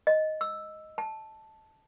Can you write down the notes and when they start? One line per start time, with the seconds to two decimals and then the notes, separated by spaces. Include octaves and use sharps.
0.07 D#5
0.41 E6
0.98 A5